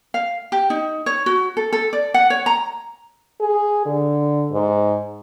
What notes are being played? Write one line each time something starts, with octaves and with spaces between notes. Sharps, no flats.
F5
G4
D#4
C#5
F#4
A4
A4
D5
F#5
C#5
A#5
G#4
D3
G#2